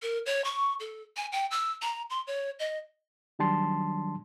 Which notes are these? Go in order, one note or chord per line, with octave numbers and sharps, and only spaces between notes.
A#4
C#5
C#6
A4
G#5
G5
E6
A#5
C6
C#5
D#5
D#3 F#3 G3 D4 A5 C6